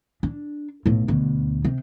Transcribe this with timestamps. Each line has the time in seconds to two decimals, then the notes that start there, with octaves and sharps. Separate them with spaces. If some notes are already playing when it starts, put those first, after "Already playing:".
0.23 D4
0.86 B1 A2
1.08 D2 B2
1.65 C3